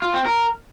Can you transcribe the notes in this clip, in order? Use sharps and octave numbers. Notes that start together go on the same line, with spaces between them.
F4
C4
A#4